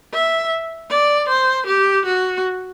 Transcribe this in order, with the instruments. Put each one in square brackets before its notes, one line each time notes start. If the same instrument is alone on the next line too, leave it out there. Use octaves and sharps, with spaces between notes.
[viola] E5
D5
C5
G4
F#4